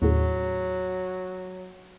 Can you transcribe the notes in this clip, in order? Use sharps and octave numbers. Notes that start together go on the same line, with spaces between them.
D#2 A2 C#3 F#3